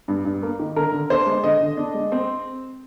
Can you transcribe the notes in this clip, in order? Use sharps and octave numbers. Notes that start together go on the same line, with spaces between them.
G2
G2
A#3
D#3
D3 A#4
D3
D4 C5
G#3
D3 D#5
D3
D4
G#3
C4